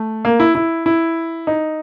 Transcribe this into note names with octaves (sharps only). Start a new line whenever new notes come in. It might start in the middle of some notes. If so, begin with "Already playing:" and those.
Already playing: A3
A#3
E4
E4
E4
D#4